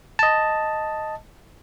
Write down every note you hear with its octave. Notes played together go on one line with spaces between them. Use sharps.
D#5 A5